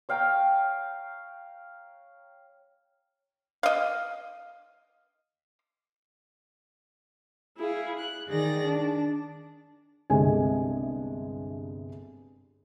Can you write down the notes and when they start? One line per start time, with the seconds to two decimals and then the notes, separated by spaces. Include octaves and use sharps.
0.09 C#5 F5 G5 A#5
3.63 D#5 F5
7.58 E4 G#4 F5
7.99 F#6
8.28 D#3 D#4 G#4 D5 A#6
8.64 D4
10.10 G1 C2 G#3 G4 G#4 G#5